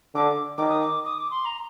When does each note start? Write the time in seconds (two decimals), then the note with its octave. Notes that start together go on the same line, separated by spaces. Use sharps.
0.15 D3 D6
0.57 D#3 D6
0.69 D#6
0.81 D6
1.05 D#6
1.18 D6
1.31 C6
1.45 A#5